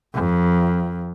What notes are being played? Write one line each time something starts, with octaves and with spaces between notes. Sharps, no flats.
F2